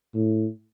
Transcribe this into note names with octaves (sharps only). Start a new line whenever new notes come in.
A2